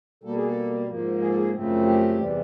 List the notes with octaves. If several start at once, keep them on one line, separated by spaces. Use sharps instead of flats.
B2 G3 A#3 A4
G#4
A4
G#2 F3 A#3
G#4
A4
G#4
F#2 C#3 F3 A3 C4
G4
E2 C3 E3 G3